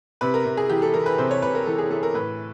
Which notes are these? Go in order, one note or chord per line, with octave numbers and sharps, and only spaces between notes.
C3 B4
A#4
C3
G#4
E3 G4
A4
E3 A#4
B4
C3 C5
C#5
C3 B4
A#4
E3 A4
G#4
E3 A4
A#4
A2 B4